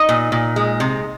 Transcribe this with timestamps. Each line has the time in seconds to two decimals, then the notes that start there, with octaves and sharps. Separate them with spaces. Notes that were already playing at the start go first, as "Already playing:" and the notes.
Already playing: D#4 D#5
0.09 A#2
0.32 A#2
0.56 G#3
0.80 C3